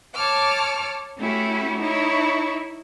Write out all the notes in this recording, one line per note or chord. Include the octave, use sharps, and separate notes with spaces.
C#5 A5 D6 F6
A3 C#4 E4 F#4 G4
D#4 E4 C#5